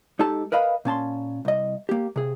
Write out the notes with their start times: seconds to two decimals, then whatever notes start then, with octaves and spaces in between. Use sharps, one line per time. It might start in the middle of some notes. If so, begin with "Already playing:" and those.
0.19 G#3 D#4 G4 A4 A5
0.52 A#4 B4 D#5 F5 B5
0.85 A#2 C#4 A5 C6
1.45 C2 D#5
1.89 A#3 G4
2.16 C3 G#4